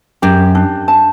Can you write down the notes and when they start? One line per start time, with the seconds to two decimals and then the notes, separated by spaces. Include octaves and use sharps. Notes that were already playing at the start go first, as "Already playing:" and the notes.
0.22 F#2 G4
0.55 D4
0.88 A5